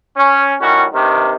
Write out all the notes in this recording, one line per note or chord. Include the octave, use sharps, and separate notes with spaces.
C#4
A2 D#3 G3 C#4 F#4
G2 C3 D#3